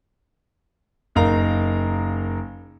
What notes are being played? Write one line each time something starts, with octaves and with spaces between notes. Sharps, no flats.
F#1 D#4 A#4 F5 A#5